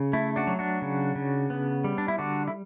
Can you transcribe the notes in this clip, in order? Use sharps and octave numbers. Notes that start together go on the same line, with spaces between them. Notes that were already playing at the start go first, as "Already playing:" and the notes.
Already playing: C#3
A3 E4
D4 F#4
F#3
D4 F#4
C#3
C#3
B3
G3
D4
E4
D3 D4 F#4
E4